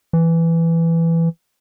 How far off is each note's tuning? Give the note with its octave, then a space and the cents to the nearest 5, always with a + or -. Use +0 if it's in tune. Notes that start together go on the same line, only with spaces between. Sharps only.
E3 +10